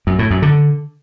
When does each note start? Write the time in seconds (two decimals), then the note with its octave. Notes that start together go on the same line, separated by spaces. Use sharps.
0.07 F#2
0.19 A2
0.31 F#2
0.42 D3